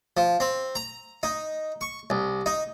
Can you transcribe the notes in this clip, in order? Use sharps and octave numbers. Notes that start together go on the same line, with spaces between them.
F3
C4
A#5
D#4
C#6
C2
D#4